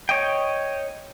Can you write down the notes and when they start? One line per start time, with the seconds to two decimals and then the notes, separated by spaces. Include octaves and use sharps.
0.09 C#5 D#5 G5